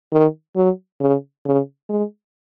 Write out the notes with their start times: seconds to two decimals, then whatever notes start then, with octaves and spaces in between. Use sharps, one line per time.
0.12 D#3
0.56 F#3
1.00 C#3
1.45 C#3
1.89 G#3